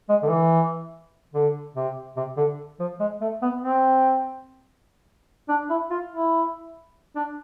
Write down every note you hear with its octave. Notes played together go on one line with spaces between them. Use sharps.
G#3
D3
E3
D3
C3
C3
D3
F3
G#3
A3
B3
C4
D4
E4
F4
E4
D4